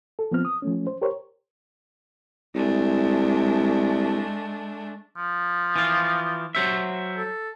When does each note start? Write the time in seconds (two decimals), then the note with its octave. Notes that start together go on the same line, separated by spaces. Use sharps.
0.19 A4
0.31 F3 B3 C4 F6
0.45 D#6
0.62 F3 A3 C#4
0.87 C5
1.02 G4 A#4 C5 C#5
2.54 C2 G#3 A3 D4
5.17 F3
5.76 E3 F4
6.55 F#3 C5 E5
7.17 A4